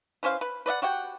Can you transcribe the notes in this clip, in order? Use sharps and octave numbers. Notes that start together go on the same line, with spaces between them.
E3 C#4 C5 F5
B4
B4 D5 D#5 F#5
F#4 G4 F#5 G5